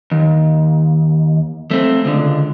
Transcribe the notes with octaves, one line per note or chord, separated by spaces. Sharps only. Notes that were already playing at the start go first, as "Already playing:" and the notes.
D#2
A3 C4
C#2 D3